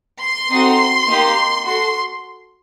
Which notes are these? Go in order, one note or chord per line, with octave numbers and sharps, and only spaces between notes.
C6
C4 D#4 F#4 A4
A#3 D#4 G4
F#4 A4 C6